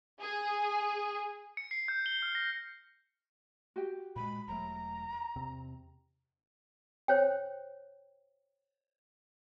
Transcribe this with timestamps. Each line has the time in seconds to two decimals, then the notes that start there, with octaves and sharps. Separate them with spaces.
0.21 G#4
1.57 C#7
1.71 C7
1.88 G6
2.06 G7
2.22 F6
2.35 A#6
3.76 F#4 G4 G5
4.16 A#2 G#3 B5
4.48 E1 F#3 A3 A#5
5.36 E2 C3 C4
7.08 C5 C#5 G5